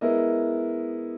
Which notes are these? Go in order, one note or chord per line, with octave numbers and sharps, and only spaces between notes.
G#3 B3 E4 A#4 D#5